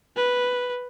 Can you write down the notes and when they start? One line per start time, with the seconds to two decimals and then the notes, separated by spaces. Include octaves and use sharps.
0.17 B4